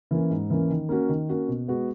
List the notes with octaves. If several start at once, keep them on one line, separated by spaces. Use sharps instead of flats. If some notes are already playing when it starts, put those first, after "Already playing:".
E3 A#3 C#4
G#2
E3 A#3 C#4
D#3
A#3 C#4 F#4
D#3
A#3 C#4 F#4
B2
G#3 B3 F#4